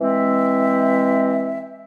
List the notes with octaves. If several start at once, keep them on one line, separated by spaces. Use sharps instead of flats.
E3 G#3 C4 E5